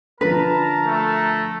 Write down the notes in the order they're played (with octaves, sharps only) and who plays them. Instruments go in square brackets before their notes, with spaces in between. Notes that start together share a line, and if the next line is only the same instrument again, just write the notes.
[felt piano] D3 F3 [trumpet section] A#4 A5 A#5 [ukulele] B4
[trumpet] A3